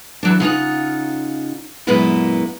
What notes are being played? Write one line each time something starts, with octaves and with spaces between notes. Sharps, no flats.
E3 F#3 D4
C#3 D#4 F4 F#5
F#2 A#2 G#3 A#3 B3 E4